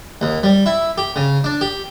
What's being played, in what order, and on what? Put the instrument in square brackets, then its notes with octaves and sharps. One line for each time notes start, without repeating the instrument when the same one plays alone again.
[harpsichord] D#2
G3
E4
G4
C#3
D4
G4